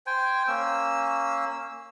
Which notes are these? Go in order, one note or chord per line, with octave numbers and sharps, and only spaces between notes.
C5 G5 G#5
A#3 C#4 E6